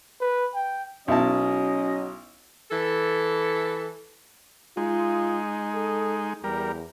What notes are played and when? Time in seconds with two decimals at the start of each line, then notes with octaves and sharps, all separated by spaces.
0.21 B4
0.54 G5
1.08 B1 F#3 C#4 E4 D#5 A5
2.71 E3 A4
4.77 G#3 D#4 F4
5.74 A4
6.44 E2 G3 A#4